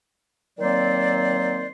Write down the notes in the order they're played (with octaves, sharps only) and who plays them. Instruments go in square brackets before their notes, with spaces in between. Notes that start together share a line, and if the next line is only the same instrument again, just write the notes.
[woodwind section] D#3 F#3 A#3 C4 C5 D5